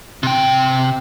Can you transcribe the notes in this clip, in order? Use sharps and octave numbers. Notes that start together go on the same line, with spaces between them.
C3 G5